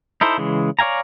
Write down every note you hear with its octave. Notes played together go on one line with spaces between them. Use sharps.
D#4 E4 A4 C5
C#3 E3 G#3
C#5 D5 F5 G#5 A#5